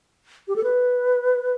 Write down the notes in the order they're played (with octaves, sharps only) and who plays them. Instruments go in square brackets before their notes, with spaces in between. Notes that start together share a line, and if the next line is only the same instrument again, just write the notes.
[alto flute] G4
A4
B4